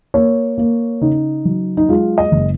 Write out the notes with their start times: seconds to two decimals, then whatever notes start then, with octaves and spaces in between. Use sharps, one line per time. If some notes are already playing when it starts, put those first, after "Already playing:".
0.14 A#3 C#5
0.58 A#3
1.01 C#3 D#4
1.45 F#3
1.77 D#4
1.89 G#3 F4
2.18 D#5
2.32 F#1